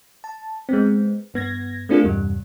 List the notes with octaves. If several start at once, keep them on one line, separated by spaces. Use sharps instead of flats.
A5
G#3 B3 C4
G2 B3 G#6 A#6
A3 C4 D4 F4 G#4 A#4
E2 G2 C3 G3